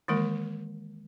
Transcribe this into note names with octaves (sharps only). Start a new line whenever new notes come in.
D#3 E3 G#3 A#3 A#4